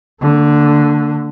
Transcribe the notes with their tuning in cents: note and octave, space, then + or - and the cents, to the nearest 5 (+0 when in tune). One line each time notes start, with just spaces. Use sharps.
D3 +0 A#3 -45